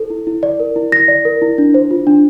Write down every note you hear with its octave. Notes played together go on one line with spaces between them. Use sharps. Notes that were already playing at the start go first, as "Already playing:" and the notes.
Already playing: E4 A4 C5
E4
E4
D5
A#4
E4
E4 A#6
D5
A#4
E4
D4
C5
F4
D4